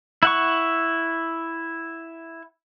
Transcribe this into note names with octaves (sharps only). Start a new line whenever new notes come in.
E4 F#5 C#6